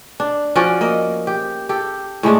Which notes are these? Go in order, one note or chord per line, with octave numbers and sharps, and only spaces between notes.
D4
F3 C#4 F#4 D5
A#3 D#5
G4
G4 A4
A2 G#3 A3 D4